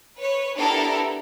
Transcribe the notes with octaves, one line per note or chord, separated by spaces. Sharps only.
B4 C#5
B3 D4 E4 G4 A4 A#4